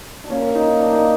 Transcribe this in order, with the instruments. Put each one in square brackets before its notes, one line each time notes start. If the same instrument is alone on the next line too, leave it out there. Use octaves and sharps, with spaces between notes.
[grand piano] D4
[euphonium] A#3 [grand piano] C#4
[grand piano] D#4
D4
D#4